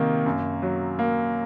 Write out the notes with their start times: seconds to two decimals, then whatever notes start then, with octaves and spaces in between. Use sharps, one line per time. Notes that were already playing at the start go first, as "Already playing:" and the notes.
Already playing: C3 D#3 A#3
0.26 F#2
0.62 F#3
0.99 A#3